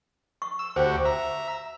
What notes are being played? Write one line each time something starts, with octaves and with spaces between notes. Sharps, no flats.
C#6
E6
D2 F#4 G4 C5
E5 A#5